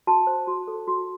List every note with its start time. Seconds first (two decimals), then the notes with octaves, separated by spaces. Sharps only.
0.07 F#4 A5
0.27 C5
0.47 F#4
0.68 A4
0.87 F#4